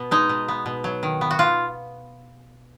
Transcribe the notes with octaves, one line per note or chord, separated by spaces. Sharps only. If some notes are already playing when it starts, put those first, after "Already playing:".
Already playing: B2 B3
G#3 D#4
B2
B3
B2
F#3
D#3
B3
F#4
F4